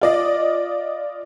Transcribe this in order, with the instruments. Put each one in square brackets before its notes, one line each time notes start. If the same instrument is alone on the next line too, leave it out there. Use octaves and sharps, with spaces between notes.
[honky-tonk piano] F4 D5 D#5